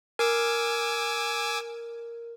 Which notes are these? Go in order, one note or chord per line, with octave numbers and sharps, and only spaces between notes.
A#4 G#5 D6 E6